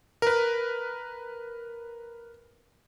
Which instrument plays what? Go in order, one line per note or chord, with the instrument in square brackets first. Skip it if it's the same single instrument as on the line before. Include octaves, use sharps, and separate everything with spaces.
[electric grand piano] A#4 B4